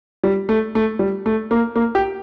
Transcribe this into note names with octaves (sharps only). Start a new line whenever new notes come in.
G3
A3
A3
G3
A3
A#3
A#3
G4